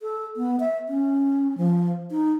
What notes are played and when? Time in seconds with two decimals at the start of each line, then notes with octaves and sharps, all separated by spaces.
0.01 A4
0.37 B3
0.60 E5
0.89 C#4
1.58 F3
2.11 D#4